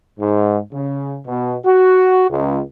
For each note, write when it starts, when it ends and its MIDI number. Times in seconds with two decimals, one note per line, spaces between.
0.20 0.58 44
0.73 1.19 49
1.27 1.56 47
1.65 2.27 66
2.30 2.60 37